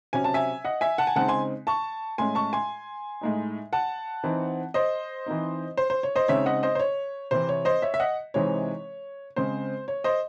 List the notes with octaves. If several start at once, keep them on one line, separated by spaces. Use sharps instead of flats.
C3 F#3 C#4 G#5
A5
E5 G#5
D#5 F#5
E5 G#5
F#5 A5
G#5
C#3 G#3 C4 D#4 F#5 A5
G#5 C6
A5 C#6
A2 G#3 C#4 G#5 C6
A5 C#6
G#5 C6
A2 G#3 D#4
F#5 A5
E3 C4 D#4
C5 D#5
E3 C4 D#4
C5
C5
C#5
C5 D#5
C#3 G#3 C4 D#4 C#5 E5
D#5 F#5
C5 D#5
C5
C#5
C3 E3 C4 C5
C#5
C5 D#5
C#5 E5
E5
D#5 F#5
C3 E3 G#3 C4 D#4 C#5
C#3 G#3 C4 C5
C#5
C5 D#5